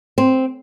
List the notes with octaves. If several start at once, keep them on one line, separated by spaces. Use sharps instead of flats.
C4